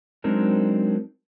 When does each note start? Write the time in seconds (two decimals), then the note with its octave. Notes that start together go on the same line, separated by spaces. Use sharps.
0.24 F#3 G#3 C4 D4 D#4 A#4